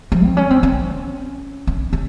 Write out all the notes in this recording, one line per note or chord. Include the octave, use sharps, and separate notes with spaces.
F3
C4
C#4
C4
C#4
C#4
C#4